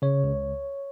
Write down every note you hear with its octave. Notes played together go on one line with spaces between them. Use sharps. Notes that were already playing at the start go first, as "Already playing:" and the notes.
C#3 C#5
C#2